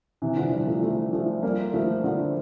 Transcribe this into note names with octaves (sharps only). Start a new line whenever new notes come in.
C3 E3
D3 F3
E3 G3
F3 A3
F3 A3
F3 A3
G3 A#3
F3 A3
D3 F3